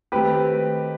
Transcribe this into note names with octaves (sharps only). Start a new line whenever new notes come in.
D#3 A3 C4 F#4 G4 B4